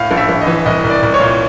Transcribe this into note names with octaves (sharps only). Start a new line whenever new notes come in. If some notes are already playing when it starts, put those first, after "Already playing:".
Already playing: A2 F5
A#1
E5
A#1
D#5
E3
C2 D#5
C2
D5
C2
C#5
A#2